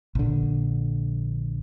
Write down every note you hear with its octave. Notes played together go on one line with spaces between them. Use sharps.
A#1 D3